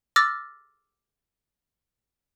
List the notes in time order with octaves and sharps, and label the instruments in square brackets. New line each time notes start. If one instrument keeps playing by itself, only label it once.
[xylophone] D6 E6 F6 A6 A#6